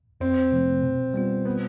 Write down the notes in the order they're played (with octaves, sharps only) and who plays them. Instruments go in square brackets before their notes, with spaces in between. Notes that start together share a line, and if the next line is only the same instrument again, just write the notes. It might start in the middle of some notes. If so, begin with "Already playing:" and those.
[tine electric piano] F2 [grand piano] C4
[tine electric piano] C3 F3 A3
B2
G3 B3 F4
[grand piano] B3